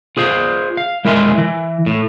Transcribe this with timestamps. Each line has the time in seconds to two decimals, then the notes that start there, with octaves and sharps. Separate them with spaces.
0.17 F4 G#4 C5 F5
0.77 F5
1.05 G#3 E4 A#4 E5 G#5 C6
1.38 E3
1.86 A2